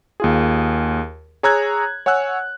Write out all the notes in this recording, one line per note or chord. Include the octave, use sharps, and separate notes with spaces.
D#2 F4 G#4
G#4 C#5 A#5 E6 F#6 G#6
C#5 F#5 G#5 E6 F#6